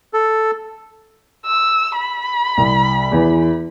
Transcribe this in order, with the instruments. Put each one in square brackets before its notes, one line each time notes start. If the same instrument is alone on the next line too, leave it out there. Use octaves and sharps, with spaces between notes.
[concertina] A4
[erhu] E6
B5
[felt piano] C2
E2 E3